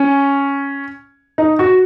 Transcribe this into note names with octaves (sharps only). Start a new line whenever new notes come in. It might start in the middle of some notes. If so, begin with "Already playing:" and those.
Already playing: C#4
D#4
F#4